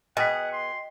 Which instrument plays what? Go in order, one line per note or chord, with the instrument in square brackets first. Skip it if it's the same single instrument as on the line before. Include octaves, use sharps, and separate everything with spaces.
[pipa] B2 G#4 [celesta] D#5 G5 B6 [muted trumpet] F#5
[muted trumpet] C6